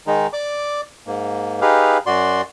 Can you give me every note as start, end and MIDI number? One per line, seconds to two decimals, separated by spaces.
0.07 0.27 51
0.07 0.27 56
0.07 0.27 63
0.33 0.81 74
0.33 0.81 86
1.07 1.60 44
1.07 1.60 58
1.61 1.98 63
1.61 1.98 67
1.61 1.98 68
1.61 1.98 71
1.61 1.98 77
2.06 2.41 42
2.06 2.41 66
2.06 2.41 74
2.06 2.41 84